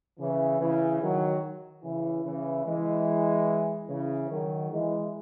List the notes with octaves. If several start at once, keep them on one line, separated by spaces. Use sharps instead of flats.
C#3 E3
C#3 E3
D#3 F#3
C#3 E3
C#3 E3
E3 G#3
C#3 E3
D#3 F#3
E3 G#3